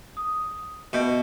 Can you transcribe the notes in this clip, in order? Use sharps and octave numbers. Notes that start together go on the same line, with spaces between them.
D#6
B2 E5 G6